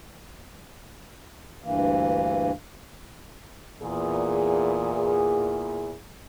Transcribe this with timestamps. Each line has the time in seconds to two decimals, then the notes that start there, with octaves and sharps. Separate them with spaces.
1.64 D2 G2 E3 A#3
3.83 E2 A#2 G#4